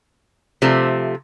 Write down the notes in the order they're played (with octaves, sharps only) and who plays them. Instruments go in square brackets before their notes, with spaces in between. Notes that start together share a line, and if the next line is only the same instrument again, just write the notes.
[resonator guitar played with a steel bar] C3 F3 A3